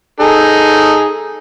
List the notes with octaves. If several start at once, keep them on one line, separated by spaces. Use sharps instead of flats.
D#4 G#4 A4